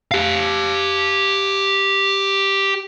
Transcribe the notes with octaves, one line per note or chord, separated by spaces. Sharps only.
G4 F5